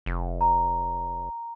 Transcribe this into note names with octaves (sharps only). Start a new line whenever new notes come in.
F1
A#5